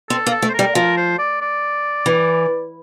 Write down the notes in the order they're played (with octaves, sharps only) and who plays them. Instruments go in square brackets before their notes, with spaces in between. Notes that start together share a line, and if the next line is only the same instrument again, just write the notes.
[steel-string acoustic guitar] C4 [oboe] A4
[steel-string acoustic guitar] A#3
[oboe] A4
[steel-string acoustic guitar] A3
[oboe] C5
A#4
[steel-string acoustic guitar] G3
[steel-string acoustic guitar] F3 [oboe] A#4
[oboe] C5
D5
D5
[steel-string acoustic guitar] E3